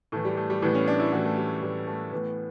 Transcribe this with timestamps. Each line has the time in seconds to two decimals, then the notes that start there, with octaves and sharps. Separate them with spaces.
0.12 A2 E3 A3
0.25 G3
0.37 A3
0.50 G3
0.62 A2 E3 B3
0.75 C#4
0.88 D4
1.00 E4
1.12 A2 E3 F#4
1.25 A3
1.37 G3
1.62 A2 E3 G3
1.87 A3
2.12 A2 E3 B3